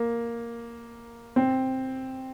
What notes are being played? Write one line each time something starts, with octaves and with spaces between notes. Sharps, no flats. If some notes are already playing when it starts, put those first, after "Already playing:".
Already playing: A#3
C4